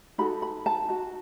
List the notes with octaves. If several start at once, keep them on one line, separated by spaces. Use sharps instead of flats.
D#4 F#4 A4 B5
B5
A5
D#4 F#4